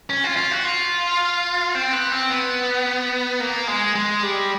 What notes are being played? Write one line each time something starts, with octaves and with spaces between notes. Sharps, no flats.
C#4
F4
F4
F#4
F4
C4
B3
C4
B3
A#3
G#3
G#3
G3